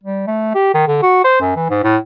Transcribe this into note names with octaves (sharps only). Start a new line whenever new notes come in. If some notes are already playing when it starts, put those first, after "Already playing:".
G3
A3
G4
D#3
D3
F#4
C5
F#2
E3
G#2
A2